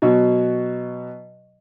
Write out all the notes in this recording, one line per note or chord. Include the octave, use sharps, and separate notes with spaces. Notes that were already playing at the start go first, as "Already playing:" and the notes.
B2 F#3